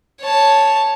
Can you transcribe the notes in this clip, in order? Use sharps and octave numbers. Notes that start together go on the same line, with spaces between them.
C#5 A5